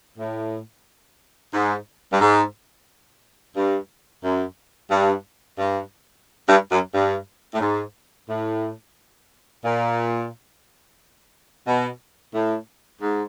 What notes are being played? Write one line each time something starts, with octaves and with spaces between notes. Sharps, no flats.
A2
G#2
G2
G#2
G2
F#2
G2
G2
G2
F#2
G2
A2
G#2
A2
A#2
B2
A2
G#2